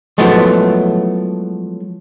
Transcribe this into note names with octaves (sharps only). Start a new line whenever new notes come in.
F3 F#3 G#3 A3 B3 E4